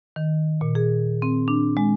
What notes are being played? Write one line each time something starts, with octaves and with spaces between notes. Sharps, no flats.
D#3
A#2
G#4
C4
D4
G#3